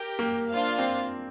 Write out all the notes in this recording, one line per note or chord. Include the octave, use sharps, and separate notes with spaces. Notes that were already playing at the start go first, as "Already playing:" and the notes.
Already playing: G4 A#4 G5
A#3
D4 F4 C5 F5
C4